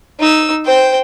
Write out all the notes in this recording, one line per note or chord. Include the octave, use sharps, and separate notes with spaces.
D#4 E6
C5 G5